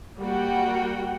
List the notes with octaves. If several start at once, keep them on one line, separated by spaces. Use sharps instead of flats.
G3 A#3 F#4 F#5 G5